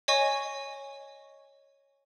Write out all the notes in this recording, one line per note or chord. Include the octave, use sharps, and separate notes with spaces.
C#5 D#5 G#5 C#6